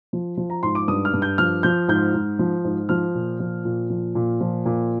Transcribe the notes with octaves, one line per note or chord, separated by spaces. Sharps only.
F3
F3
A#5
G#2 C6
D6
G2 D#6
F6
G2
G6
F3 F6
F3 G6
G#2 G6
G#2
F3
G#2
F3 F6
A#2
F3
A#2
F3
A#2
F3
A#2